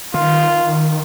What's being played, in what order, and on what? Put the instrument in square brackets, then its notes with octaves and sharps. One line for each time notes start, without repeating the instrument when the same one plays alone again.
[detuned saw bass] D#3 [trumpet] F4